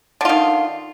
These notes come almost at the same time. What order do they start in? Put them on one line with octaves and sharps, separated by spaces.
D3 F4 D#3